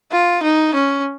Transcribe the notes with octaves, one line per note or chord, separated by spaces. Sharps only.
F4
D#4
C#4